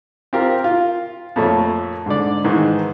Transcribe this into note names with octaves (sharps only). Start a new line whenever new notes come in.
C4 F4 G4 A#4
F4
F2 A#2 A3 C#5 A#5
G#2 D3 D5
G#2 D#3 E3 G#3